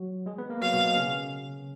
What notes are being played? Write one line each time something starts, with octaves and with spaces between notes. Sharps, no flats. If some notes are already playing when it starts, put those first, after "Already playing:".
Already playing: F#3 F#4
G#3 G#4
B3 B4
A#3 A#4
F#3 F#4 F5
B2 B3
B2 B3
C#3 C#4